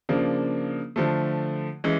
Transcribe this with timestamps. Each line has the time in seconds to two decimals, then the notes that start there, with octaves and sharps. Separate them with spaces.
0.09 C#3 F3 A#3 D4
0.96 D3 F3 A3
1.84 E3 G#3 C#4